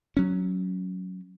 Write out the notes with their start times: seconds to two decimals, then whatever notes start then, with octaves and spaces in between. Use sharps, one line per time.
0.17 F#3 C#4